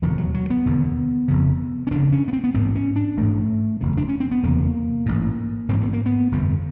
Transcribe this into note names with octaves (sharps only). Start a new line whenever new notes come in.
E1 D#2 D3 F3
F#3
F#3
B3
E1 D#2 D3
F1 F2 C#3
C#4
F1 F2 C#3 D4
C#4
B3
C4
B3
A1 G#2 C4
C#4
D4
A1 G#2 A3
F#1 E2 C3
D4
C#4
C4
B3
F#1 E2 C3 A#3
A1 G#2
A1 G#2 C4
B3
A#3
B3
G1 F2 C3